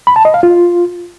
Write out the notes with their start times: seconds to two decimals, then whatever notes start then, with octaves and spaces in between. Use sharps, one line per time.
0.07 B5
0.16 A5
0.25 D#5
0.34 F5
0.43 F4